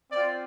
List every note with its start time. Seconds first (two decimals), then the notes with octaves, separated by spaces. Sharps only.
0.11 C4 F4 D5